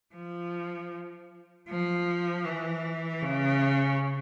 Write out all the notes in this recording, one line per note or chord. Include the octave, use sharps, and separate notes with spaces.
F3
F3
E3
C#3